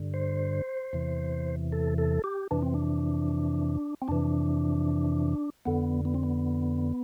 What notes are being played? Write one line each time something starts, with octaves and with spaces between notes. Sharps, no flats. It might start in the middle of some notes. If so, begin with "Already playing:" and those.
Already playing: G2 D3
C5
E2 C3 E3
A4
A4
G4
F2 C3 E3 D4
C4
D4
C4
F2 C3 E3 D4
F2 D3 B3
B3
C4
B3